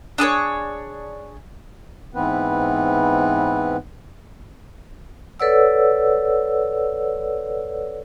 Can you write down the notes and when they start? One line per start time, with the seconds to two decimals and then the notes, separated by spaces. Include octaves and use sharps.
0.18 D4 G#4 B4 C#5
2.15 G#2 E3 B3 C4 B4
5.40 A4 B4 C#5 D5 F#5 E6